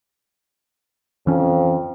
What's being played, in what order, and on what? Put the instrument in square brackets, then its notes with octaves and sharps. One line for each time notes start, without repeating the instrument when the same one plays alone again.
[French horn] F2 [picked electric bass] E3 C#4